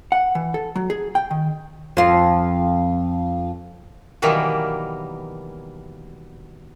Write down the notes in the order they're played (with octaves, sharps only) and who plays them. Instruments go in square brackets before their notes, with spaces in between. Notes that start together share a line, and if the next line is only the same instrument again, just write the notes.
[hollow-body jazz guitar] F#5
E3
A4
F#3
G#4
G5
D#3
[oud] F2 F4
[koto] B2 D#3 E3 F#3 G3 A#3